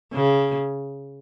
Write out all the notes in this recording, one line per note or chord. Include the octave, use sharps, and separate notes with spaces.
C#3